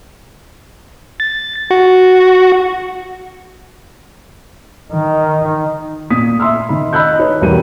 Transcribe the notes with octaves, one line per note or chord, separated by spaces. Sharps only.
A6
F#4
D#3
A#2 D#6 B6
E5 C6 E6 F6
D#3 B5
D#5 B5 E6 F#6 G6
D#4 B4 C#5
B1 E2 G3 A#4 D#7